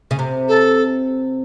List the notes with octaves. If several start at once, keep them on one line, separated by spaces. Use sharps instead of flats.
C#3
C3
A4